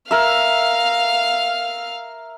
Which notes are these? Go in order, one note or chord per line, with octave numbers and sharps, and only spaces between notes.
A#4 E5 F5 F6